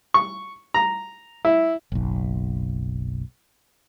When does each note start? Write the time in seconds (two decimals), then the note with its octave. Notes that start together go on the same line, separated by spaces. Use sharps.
0.14 C#6
0.74 A#5
1.45 E4
1.92 F#1 B1